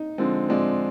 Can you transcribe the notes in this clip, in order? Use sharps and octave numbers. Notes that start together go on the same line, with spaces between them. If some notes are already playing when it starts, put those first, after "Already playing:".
Already playing: D#4
D3 F3 G#3 C4
D3 F3 G#3 C4 D4